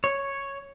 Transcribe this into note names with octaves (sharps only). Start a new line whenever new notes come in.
C#5